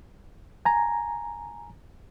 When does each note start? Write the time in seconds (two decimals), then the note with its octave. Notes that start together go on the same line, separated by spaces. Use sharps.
0.65 G#5 A#5